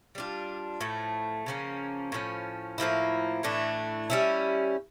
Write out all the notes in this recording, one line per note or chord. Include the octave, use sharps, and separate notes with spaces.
G3 D4 F4
A2 F3 A3
C#3 F3 A#3 C#4
A2 F3 C#4
A2 F3 A#3 E4
A2 E3 A3 D4
G3 C#4 E4